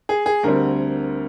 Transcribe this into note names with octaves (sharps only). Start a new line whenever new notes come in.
G#4
G#4
D2 D3 G3 C4 A#4